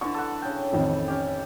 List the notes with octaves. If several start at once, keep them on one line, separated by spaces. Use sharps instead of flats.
D3 E3 D4 C#6
A4 F#5
C#3 G5
A1 F2 D#3
C#4 G4